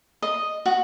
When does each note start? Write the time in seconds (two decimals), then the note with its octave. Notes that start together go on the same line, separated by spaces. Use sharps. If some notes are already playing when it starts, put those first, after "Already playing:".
0.22 D#5
0.66 F#4